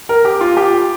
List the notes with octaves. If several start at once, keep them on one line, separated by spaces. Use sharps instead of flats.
A#4
G4
F4
G4